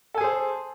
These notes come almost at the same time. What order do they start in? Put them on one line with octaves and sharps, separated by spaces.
A4 G#5 G#4 C5